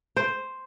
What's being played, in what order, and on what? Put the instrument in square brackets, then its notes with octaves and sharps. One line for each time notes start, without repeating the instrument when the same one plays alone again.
[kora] C5